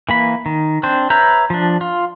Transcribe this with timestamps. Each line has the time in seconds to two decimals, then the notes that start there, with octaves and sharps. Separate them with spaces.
0.09 E3 A#3 B5
0.46 D#3
0.83 C4 D4 C5
1.10 B4 C#5 E5 A#5 G6
1.50 F3 D4
1.81 F4